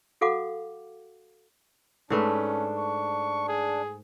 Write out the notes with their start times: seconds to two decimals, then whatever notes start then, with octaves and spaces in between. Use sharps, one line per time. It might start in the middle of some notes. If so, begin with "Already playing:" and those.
0.21 F#4 A4 F5 F#5 D6
2.10 G#2 A3 C#4 D4 B4
2.78 C#6
3.48 G#4